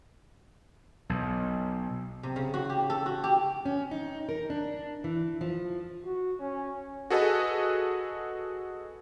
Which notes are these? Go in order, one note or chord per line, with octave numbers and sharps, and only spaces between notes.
B1
C3
C#3
F#4
G4
A4
F#4
G4
C#4
D#4
A#4
D4
E3
F3
F#4
C#4
F#4 G#4 A4 B4 D#5